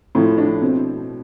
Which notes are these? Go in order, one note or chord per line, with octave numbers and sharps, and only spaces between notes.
A2 F3 E4
D4
B2 C4